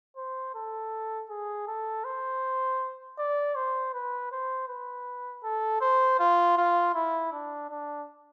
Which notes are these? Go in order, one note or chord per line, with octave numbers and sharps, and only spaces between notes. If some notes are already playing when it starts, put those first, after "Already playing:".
C5
A4
G#4
A4
C5
D5
C5
B4
C5
B4
A4
C5
F4
F4
E4
D4
D4